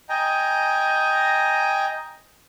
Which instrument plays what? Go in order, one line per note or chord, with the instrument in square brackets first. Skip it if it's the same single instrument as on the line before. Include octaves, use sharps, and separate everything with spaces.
[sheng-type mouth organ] D#5 G5 G#5 A#5